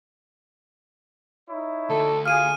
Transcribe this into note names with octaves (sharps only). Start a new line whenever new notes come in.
D#4 E4 C#5
D2 A4
F4 G#4 F6 D#7